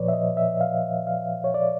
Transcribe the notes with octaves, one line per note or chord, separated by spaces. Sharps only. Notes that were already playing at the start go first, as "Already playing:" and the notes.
Already playing: A#2 F3 B4 C#5 D5
E5
D#5
E5
F5
F5
C#5
D5